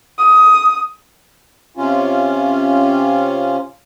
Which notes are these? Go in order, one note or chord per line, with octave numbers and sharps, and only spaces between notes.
D#6
C3 C#4 F4